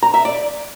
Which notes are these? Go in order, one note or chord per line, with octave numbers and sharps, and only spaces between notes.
A#5
E5
D5